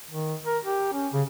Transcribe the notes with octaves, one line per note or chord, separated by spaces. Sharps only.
D#3
A#4
G4
C#4
C#3